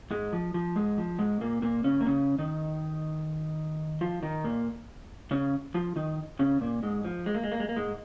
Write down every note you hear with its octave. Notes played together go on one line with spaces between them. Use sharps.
G#2 G#3
F3
F3
G#2 G#3
F3
G#2 G#3
A#2 A#3
A#2 A#3
C#3 C#4
A#3
C#3 C#4
D#3 D#4
F3 F4
D#3 D#4
A#2 A#3
C#3 C#4
F3 F4
D#3 D#4
C#3 C#4
A#2 A#3
G#2 G#3
F3
G#3
A#3
G#3
A#3
G#3
A#3
G#2 G#3